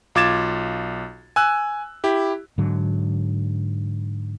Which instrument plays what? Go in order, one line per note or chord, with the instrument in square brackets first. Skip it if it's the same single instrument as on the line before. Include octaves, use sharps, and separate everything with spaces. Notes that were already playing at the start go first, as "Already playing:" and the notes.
[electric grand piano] B1 F4 D6 G#6 A6 E7
G#5 E6 F#6
E4 G4
[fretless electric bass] G#2 D3 F#3